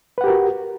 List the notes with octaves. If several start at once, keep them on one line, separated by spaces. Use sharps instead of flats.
F#4 G4 A#4 B4 F#5